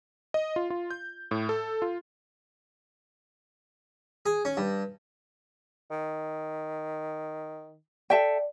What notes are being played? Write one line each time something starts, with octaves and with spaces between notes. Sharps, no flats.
D#5
F4
F4
G6
A2
A4
F4
G#4
C#4
G2
D#3
A4 D5 E5 G5